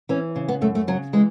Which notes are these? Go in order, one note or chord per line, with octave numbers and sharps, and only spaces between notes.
E3 C#4
C#3
B3
F#2 A3
A3
C#3 F#3
E3 G#3